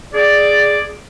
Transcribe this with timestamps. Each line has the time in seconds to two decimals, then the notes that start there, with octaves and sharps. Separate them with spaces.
0.14 G#4 D5